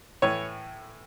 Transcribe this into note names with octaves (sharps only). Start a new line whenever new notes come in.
A2 E3 C#5